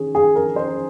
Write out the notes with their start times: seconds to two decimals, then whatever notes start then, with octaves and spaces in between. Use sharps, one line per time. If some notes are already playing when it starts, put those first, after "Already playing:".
Already playing: D#3 C#4 G#4
0.15 G#4
0.35 A#4
0.56 C5